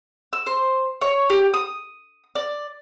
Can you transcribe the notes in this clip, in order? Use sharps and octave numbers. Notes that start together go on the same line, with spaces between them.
E6
C5
C#5
G4
D#6
D5